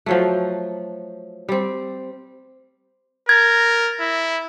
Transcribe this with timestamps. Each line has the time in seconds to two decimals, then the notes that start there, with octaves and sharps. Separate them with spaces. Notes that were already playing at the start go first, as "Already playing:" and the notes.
0.06 F3 F#3 A3
1.49 G3 C4
3.29 A#4 G#6 A6
4.01 E4